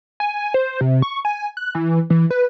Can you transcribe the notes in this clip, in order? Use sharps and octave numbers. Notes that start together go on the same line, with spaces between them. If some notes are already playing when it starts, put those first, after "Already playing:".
G#5
C5
C3
C#6
G#5
F#6
E3
E3
B4